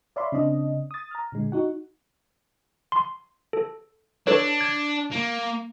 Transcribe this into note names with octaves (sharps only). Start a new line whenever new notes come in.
C#5 D5 E5 F5 B5 C6
C#3 C4 D4 D#5
D#6 A6
A#5 F6
A#2 D3 G#3
D#4 F#4 F#5
C6
A4
D4 A4 B4 C#5
G#6
A#3